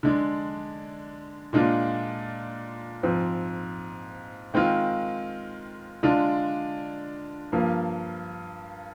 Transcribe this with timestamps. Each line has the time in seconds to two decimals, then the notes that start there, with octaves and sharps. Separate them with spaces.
0.03 D3 G#3 D4
1.53 A#2 G#3 D4 F4
3.03 G#2 F3 C4
4.54 D#3 G#3 C4 F4
6.03 D3 G#3 D4 F4
7.52 G2 F3 A#3